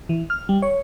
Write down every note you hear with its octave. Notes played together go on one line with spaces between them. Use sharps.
E3
F6
G3
C#5